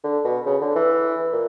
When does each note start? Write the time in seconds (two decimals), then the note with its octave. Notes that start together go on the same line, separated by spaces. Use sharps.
0.04 D3
0.25 B2
0.46 C#3
0.61 D3
0.75 E3
1.33 A#2